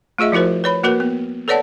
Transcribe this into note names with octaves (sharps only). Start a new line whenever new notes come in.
A3 F4 G#4 D#5 E5
F3 E4 F#4 A#4 C5
B4 C#5 B5
A#3 F#4 A#4 B4
B3
A4 B4 C#5 D5 F#5 A5